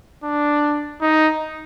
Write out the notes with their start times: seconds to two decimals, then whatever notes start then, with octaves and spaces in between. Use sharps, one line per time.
0.24 D4
1.01 D#4